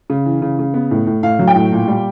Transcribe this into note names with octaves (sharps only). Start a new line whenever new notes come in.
C#3
E3
C#3
C#3
B3
A2
A2
A2 F5
F#3
G5
A2
A#2
G3